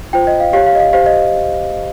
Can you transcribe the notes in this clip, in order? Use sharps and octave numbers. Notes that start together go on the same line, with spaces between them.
F4 C5 G5
D#5
F5
G4 C#5 F5
F5
D#5
F5
G4 C5 F5
D#5